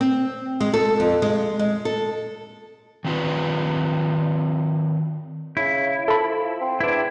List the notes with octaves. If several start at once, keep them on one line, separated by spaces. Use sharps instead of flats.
C4
G#3
A4
F2
G#3
G#3
A4
D#3 C4 F4 B4
C#3 E4
F3 A4 B5
C4
E2 D4 E4